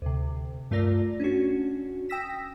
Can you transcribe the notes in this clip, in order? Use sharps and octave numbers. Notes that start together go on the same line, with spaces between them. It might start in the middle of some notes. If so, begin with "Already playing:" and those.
D2 C3
G2 A3 F4 A#4 D5 A#6
C#4 D4 F#4
G5 D#6 E6 A#6 B6 E7